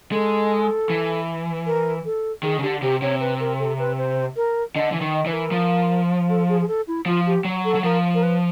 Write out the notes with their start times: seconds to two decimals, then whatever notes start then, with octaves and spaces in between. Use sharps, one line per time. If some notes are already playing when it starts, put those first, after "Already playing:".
0.12 G#3 A4
0.90 E3
1.66 A#4
2.05 A4
2.43 D#3 G#4
2.59 C#3
2.62 D3 G4
2.82 C3 G4
3.02 C3 C#5
3.20 B4
3.40 A#4
3.59 A4
3.79 B4
3.98 C5
4.36 A#4
4.75 D3 D#5
4.92 E3
5.01 D#3
5.14 D#5
5.26 E3 B4
5.33 A#4
5.52 F3
6.29 A4
6.49 G#4
6.61 G#4
6.68 A4
6.87 E4
7.06 F3 F4
7.26 G4
7.45 F#3
7.65 A4
7.75 F#3
7.84 F3 A#4
8.14 A#4
8.23 B4